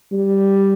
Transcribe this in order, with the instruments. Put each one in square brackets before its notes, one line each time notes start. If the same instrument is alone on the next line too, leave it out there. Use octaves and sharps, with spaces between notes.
[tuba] G3